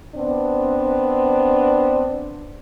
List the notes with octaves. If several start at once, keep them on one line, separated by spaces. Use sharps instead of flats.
B3 C4 D4